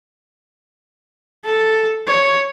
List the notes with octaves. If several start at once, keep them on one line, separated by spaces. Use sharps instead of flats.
A4
C#5